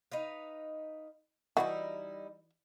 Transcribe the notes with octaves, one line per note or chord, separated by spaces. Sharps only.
D#4 B4 F5
E3 G3 D#4 E4 F#4